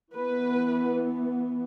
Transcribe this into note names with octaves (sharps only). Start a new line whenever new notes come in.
E3 B3 B4